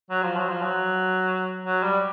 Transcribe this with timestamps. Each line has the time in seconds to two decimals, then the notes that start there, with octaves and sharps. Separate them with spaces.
0.10 F#3
0.23 F3
0.36 F#3
0.49 F3
0.62 F#3
1.65 F#3
1.83 G3